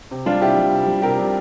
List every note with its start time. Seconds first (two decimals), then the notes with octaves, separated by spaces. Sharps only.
0.11 C3
0.26 G3 D4 F4
0.41 C3 E4 G4
0.57 G3
0.71 C3
0.87 G3
1.02 C3 G4 A#4
1.18 G3